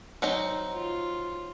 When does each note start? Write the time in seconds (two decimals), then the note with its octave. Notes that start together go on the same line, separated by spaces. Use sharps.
0.22 F#3 C4 D#4
0.74 F4